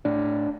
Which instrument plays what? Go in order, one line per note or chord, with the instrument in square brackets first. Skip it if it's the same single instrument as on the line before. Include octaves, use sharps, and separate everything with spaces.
[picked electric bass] A2 D4